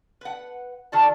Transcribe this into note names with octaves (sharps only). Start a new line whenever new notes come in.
B4 F#5
D#3 F#4 A4 D5 A5